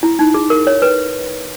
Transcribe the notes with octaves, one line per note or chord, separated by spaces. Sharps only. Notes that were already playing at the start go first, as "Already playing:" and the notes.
E4
D#4
G#4
A#4
C#5
B4